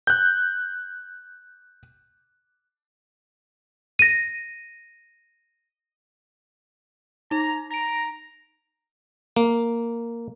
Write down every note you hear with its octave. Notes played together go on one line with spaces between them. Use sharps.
F#6 G6
A#6 D#7
D#4 A#5
A#5 A#6 D7
A#3